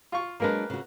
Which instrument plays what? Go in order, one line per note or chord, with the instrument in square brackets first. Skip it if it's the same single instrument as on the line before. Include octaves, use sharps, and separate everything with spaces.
[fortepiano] F4 C#6
[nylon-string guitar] F#3 G#3 D4 [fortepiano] A#3 A#4 B4
[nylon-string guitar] C#3 F#4